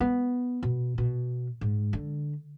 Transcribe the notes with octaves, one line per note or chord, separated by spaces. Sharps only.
B3
B2
B2
G#2
D3